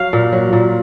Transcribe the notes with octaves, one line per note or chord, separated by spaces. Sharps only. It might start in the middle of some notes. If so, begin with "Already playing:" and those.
Already playing: F#3 F5
A#2
F#3
A#2